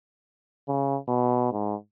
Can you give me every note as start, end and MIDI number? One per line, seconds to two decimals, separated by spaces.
0.68 0.96 49
1.08 1.49 47
1.52 1.75 44